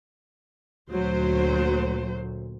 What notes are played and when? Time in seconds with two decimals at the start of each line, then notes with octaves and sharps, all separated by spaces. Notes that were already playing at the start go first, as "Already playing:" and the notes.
0.90 D2 A#2 F#3 C5